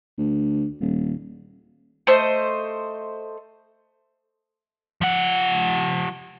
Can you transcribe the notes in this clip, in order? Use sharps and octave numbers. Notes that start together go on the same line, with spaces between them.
D2
D#1
A3 C5 D#5
F3 F#5